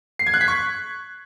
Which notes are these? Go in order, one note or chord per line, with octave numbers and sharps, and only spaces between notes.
C7
G#6
F#6
B6
C#6